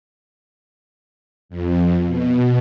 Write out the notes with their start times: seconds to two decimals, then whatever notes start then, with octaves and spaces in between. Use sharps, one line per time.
1.49 F2
2.06 B2